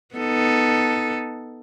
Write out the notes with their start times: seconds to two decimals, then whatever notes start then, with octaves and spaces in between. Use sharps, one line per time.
0.15 B3 D#4 A4